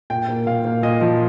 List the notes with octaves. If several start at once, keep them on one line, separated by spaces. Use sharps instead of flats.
A#2 G5
A#3
A#2 F5
A#3
A#2 D#5
F3